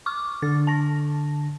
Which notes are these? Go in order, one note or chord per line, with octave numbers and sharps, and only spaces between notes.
C#6 D6 F6
D3 A6
A5 A#6